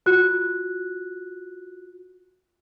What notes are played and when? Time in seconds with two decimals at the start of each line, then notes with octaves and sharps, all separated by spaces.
0.06 F4 F#4 F#6